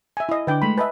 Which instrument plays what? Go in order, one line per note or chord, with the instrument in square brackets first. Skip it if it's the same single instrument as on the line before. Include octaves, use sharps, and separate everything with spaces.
[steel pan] E5 G#5
E4 D#5
[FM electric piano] D3 D4 D6 [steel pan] B4 G5
[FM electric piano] G#3 A3 C6 [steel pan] B5
[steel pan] B4 D#5 E5 [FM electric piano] G#5 A5 B5